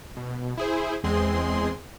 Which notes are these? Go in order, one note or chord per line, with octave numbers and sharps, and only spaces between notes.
B2
E4 G#4 C5
E2 G#3 C4 G#4 C6